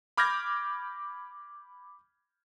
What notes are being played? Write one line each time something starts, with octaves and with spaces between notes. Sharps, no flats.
B5 D6 F6 G6 G#6 A#6